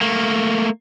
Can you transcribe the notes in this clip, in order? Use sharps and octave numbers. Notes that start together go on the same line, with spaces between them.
A3 A#3